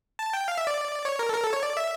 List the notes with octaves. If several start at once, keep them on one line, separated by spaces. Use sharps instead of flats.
A5
G5
F5
E5
D5
C#5
A#4
A4
A#4
A4
C#5
D5
E5